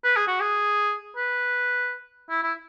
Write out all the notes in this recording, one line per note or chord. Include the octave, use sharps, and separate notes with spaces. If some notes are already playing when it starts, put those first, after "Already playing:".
B4
G#4
F#4
G#4
B4
E4
E4